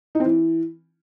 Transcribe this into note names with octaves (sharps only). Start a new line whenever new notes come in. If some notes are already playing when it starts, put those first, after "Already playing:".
D#4
C4
E3